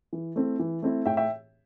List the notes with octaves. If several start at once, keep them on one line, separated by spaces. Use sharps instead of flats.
E3
A3 C4 E4
E3
A3 C4 E4
A2 E5 G5
E5 G5